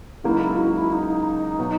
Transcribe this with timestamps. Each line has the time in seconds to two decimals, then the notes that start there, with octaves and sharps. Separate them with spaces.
0.24 C#2 C#3 F#3 A#3 D#4 E4
0.41 E4
0.58 F#4
0.74 E4
0.92 D#4
1.59 B2 F#3 B3